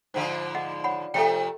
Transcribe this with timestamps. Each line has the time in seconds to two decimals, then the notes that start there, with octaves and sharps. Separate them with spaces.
0.14 G#2 D3 F3 C5 F5
0.55 D#5 F#5
0.84 C#5 F#5 B5
1.14 C3 F3 A3 A4 E5 G5